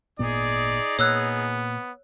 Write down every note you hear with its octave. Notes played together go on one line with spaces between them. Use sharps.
G#1 A#2 B3 D#4 G#4 D5
A#2 B3 C#5 E6 F#6